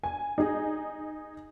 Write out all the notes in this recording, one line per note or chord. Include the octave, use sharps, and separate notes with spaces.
G#5
D#4 G#4